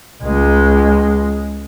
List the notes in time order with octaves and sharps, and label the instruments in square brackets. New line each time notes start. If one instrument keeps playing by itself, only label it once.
[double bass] C#2 G#3